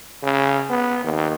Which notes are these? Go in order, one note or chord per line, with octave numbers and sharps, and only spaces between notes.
C#3
B3
D#2